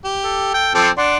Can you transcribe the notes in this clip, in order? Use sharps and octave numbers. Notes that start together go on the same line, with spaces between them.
G4
A4
G5
F3 C4 A4 C5 D6
D4 D5 F#5 C6